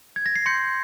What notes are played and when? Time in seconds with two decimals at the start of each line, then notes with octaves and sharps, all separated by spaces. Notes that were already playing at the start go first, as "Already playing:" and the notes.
0.16 G#6
0.26 A#6
0.36 C7
0.46 C6 G6 C#7